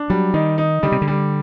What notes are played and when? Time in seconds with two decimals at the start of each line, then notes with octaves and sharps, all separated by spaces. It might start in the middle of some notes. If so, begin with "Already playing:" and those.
Already playing: D4
0.10 F#3 G3
0.34 D#3 D#4
0.58 D#4
0.83 D3 G3
0.92 C3
1.02 D3
1.08 G3